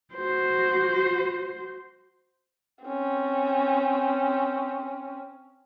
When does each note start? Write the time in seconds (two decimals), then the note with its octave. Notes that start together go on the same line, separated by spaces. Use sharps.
0.14 F#4 C5
2.84 C4 C#4